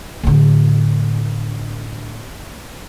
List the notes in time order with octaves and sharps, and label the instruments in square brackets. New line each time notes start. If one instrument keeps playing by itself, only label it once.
[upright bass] A2 D3